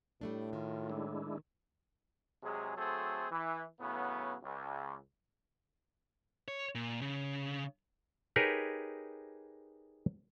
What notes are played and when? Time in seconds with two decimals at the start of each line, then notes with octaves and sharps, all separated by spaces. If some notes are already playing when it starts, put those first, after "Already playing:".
0.21 A2 G3 A3 D4
0.53 D#3 F4
0.90 G#3 D4 E4
2.43 C3 F#3 G#3 G#4
2.77 F#3 A3 C4 G#4 A4 C5
3.30 E3
3.80 A2 C#3 F#3 B3
4.44 C#2
6.48 C#5
6.75 A#2
7.01 C#3
8.36 D#4 G4 G#4 A#4 B4 C#5